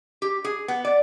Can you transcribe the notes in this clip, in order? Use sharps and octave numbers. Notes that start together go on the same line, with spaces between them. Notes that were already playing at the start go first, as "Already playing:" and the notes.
G4
G#4
B3
D5